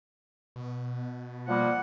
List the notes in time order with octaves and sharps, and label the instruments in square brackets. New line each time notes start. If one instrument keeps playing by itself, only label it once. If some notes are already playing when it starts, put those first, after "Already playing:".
[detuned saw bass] B2
[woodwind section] F3 G3 A#3 [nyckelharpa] F#5